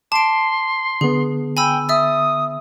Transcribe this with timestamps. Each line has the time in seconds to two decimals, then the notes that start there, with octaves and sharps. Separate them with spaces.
0.12 A5 C6 D6 D7
1.01 D3 B3 G#4
1.57 G5 G#5 B5 E6
1.89 E5 D#6 E6 A6